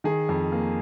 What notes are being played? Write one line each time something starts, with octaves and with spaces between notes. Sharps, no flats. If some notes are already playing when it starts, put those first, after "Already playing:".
D#3 G#4
F2
A#3